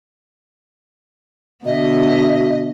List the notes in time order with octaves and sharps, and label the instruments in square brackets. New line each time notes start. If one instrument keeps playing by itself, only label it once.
[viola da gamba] B2 D3 B3 [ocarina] F#4 [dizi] D#5 [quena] E5